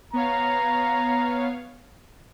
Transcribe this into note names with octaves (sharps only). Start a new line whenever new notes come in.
B3 C#5 F5 A#5